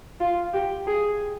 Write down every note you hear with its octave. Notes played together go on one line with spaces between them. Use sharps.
F4
G4
G#4